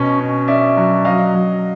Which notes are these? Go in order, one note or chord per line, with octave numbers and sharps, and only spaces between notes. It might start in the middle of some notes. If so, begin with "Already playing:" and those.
Already playing: B2 C#4 D#5
C#4
C#4 D5 E5
F#3
F#3 D#5 F5
F#3